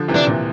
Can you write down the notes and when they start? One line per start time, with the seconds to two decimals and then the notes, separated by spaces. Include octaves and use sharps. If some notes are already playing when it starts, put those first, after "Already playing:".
Already playing: D3 F3
0.08 C3 E3
0.15 D4
0.27 A#2